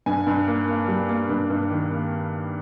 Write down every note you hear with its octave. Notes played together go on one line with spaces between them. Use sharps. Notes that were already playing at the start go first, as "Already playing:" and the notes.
G2 G#5
G2
A#3
A#3
G3
A#3
G2
G2
D#3
A#3